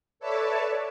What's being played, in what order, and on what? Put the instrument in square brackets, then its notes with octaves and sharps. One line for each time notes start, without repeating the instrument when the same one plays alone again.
[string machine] A4 B4 C#5 D5 E5 A5